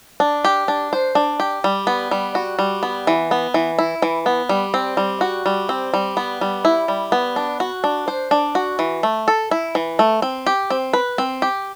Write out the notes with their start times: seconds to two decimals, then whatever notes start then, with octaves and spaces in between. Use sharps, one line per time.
0.20 D4
0.45 G4
0.68 D4
0.93 C5
1.15 D4
1.40 G4
1.64 G3
1.87 B3
2.11 G3
2.35 F#4
2.59 G3
2.83 B3
3.07 E3
3.31 B3
3.54 E3
3.79 E4
4.02 E3
4.26 B3
4.49 G3
4.74 C4
4.97 G3
5.21 F#4
5.46 G3
5.69 C4
5.93 G3
6.17 B3
6.41 G3
6.65 E4
6.88 G3
7.12 B3
7.36 D4
7.60 F#4
7.84 D4
8.08 C5
8.31 D4
8.55 F#4
8.79 E3
9.03 A3
9.28 A4
9.51 E4
9.75 E3
9.99 A3
10.22 C4
10.46 G4
10.70 C4
10.93 B4
11.18 C4
11.42 G4